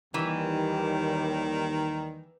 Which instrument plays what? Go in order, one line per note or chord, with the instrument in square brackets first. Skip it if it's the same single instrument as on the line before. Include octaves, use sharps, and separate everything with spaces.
[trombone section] D#2 G3 [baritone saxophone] D#3 [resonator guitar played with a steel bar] E3